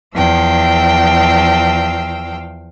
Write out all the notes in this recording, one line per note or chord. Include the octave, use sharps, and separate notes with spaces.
E2 F3 F5 G5 E6